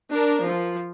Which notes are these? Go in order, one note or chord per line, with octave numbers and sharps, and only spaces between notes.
D4 A#4
F3